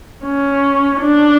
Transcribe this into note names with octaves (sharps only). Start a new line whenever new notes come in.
C#4
D4